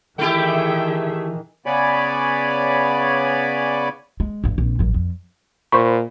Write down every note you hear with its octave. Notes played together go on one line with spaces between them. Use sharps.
D#3 E3 A3 E4 G4 G#4 E5 G5
C#3 B3 C#5 D5 G#5 B5
G#3
A1 G2
A#1 C3
A1 F#2
F2
A#2 C5 B5 C#6